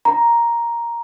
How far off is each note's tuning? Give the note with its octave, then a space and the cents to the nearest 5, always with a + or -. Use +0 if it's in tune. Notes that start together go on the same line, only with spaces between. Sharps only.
A#5 +5